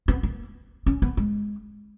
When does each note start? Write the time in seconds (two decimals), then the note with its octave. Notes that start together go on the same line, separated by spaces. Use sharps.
0.08 B3
0.23 A#3
0.86 C#4
1.02 B3
1.17 G#3